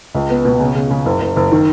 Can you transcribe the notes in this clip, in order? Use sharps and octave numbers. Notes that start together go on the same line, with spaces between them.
C#2
B3
B2
C#3
C#3
C#3
F#1
F#1
F#1
D#3